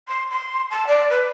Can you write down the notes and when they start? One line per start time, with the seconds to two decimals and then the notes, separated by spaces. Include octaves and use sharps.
0.08 C6
0.30 C6
0.70 A5
0.87 D5
1.10 B4